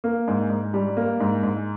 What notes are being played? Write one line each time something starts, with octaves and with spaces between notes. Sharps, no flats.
A#3
G#2
G#2
G3
A#3
G#2
G#2